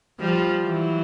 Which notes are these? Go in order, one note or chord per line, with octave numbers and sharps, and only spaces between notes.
F3 G3
E3 F#3